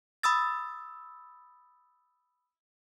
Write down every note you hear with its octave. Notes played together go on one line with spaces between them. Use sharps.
B5 D#6 E6 A6